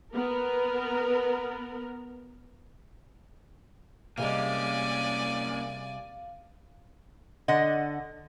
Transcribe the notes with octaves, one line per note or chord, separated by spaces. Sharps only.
B3 A#4
C3 G3 G#3 A#3 C#4 D5 F5 G#5
D3 D#5 F#5